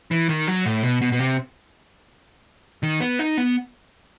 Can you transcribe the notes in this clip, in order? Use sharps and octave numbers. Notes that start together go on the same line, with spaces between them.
E3
D#3
F#3
A2
B2
B2
B2
C3
D#3
B3
D#4
B3